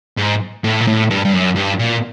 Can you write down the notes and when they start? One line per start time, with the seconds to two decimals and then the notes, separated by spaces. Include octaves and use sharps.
0.18 G#2
0.64 A2
0.81 A#2
0.87 A2
1.10 G2
1.25 G2
1.33 F#2
1.56 G2
1.79 A#2